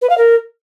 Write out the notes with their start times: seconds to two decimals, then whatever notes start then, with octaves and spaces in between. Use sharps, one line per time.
0.01 B4
0.09 F5
0.17 A#4